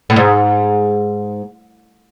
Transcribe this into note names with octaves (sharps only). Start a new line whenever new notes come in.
A2
G#2